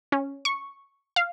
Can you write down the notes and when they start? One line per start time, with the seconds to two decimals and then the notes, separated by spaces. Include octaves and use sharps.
0.12 C#4
0.45 C#6
1.16 F5